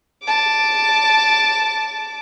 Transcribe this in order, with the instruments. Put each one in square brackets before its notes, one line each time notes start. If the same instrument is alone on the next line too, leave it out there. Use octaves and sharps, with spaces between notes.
[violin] A5 D6